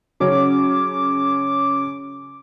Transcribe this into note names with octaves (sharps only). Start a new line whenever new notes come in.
C#3 F#3 C#4 D6